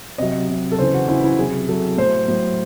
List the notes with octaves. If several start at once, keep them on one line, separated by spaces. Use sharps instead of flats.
C3 F#3 D#5
C3 F#3
A4
C#3 E3 C5
F#4
C#3 E3 E4
E4
C3 F#3 G#4
C3 F#3 A4
A2 F#3 C5
A2 F#3